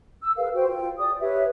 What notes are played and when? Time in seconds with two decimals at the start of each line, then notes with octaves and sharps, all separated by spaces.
0.22 E6
0.37 G#4 A#4 B4 F5
0.54 F#4 C5 G5
0.68 F4 G5
0.98 G#4 D5 D#6
1.20 G4 B4 C#5 E5